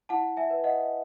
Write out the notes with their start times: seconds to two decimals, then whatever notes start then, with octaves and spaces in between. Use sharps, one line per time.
0.09 E4 F#5 A5
0.37 E5 G#5
0.50 B4
0.64 D#5 F#5